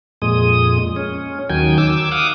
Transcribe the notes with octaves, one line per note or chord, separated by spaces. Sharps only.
F2 A#2 G#3 D#6
C#4
D#2 D#3 F#3 G5 G#5
D6 E6
F5 F#5 D6 D#6